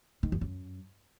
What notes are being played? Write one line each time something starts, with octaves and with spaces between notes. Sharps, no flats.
D#3
F2
F#2